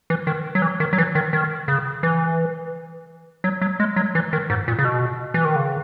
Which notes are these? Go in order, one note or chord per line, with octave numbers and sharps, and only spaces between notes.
E3
D#3
F#3
E3
D#3
F#3
E3
D#3
D#3
C#3
E3
F#3
F#3
G#3
F#3
E3
D#3
G#2
A#2
C#3
B2
E3
D#3
C#3